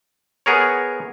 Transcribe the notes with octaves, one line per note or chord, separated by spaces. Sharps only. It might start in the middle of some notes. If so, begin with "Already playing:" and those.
B3 G#4 A#4 C#5